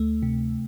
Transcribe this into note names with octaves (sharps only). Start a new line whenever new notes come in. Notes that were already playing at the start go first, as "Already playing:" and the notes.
Already playing: D2 A3
C3